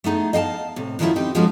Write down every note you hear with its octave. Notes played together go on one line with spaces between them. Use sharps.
A3 B3 D#4 G#4
D#5 F5 G5 A5
A2 C3
F#2 D#3 F3 C#4 E4 F4
C4 D#4 G4
F3 G#3 A3 B3 C#4 F#4